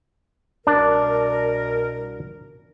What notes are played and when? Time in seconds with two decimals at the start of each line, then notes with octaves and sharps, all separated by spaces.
0.67 C2 B2 D4 A#4